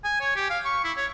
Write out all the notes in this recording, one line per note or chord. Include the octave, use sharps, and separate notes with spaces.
G#5
C#5
G4
F5
C#6
E4
C#5